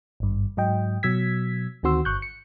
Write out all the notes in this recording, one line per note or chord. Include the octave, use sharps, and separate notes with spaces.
G#1 G2
G#2 F#3 D#5 G5
B2 F#3 E6 G#6 B6
D2 D#3 C4 F#4 C6 E6
G1 C#6 F#6 G6
C#7